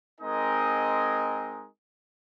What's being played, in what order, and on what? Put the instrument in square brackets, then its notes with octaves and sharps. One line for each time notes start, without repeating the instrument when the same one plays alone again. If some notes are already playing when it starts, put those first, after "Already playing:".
[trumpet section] G#3 C4 D#4 A#4 D#5 G#5